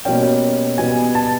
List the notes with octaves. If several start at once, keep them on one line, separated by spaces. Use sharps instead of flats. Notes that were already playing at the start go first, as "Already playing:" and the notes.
B2 G3 A#3 C#4 G5
B2 G3 B3 G#5
A5